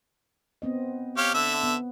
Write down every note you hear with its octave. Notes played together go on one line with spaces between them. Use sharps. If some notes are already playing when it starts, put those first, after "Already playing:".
B3 C4 D#5
G4 C#5 F5
D3 E5
B3